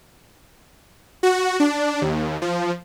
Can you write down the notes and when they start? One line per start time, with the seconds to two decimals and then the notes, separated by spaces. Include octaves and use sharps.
1.23 F#4
1.60 D4
2.01 D#2
2.42 F3